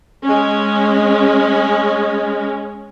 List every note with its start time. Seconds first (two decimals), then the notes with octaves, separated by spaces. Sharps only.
0.23 G#3 C#4